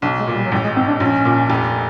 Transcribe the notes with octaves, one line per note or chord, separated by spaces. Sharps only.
B1 D4
G#3
A#2
G3
F#3
A1 G3
G#3
G#2 C4
D4
A#1 C#4
A#2
F1